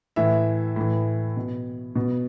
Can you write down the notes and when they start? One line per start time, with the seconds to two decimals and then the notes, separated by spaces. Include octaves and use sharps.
0.16 A2 E3 E5
0.76 A2 E3
1.37 B2
1.95 B2